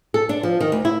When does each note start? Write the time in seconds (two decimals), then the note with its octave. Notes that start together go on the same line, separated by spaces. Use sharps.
0.14 A4
0.29 D4
0.43 F3
0.60 D#3
0.72 D2
0.85 E4